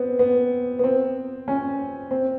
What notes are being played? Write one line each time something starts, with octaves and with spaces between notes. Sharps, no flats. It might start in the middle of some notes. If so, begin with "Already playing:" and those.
Already playing: B3 C4
B3
B3
C4
C#4
C4